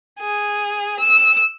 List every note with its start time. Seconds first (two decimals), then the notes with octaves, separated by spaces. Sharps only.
0.20 G#4
1.00 E6